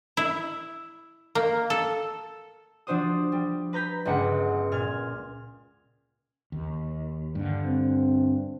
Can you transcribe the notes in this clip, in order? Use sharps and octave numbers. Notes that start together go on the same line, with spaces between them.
E4
A#3
A4
F3 D4 F#4 C5 D#6
G3
B4 A#5 G6 B6
G1 C#2 G#3 F#5 C#7
A#2 F6 G#6
D#2
G2 D3
C4